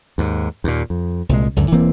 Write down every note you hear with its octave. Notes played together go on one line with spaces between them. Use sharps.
D#2 G#2
D#2 A#2
F2
C2 A#2 G#3
C#2 F#2 D3
E1 E3 A#3 C4